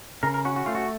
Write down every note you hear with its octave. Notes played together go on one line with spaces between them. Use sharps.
C#3 A#4
A#4
C#4 F#4
F#4
A3 F4
F#4